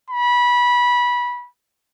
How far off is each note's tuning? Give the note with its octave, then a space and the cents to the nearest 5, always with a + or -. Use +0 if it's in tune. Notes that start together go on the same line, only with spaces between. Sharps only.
B5 -20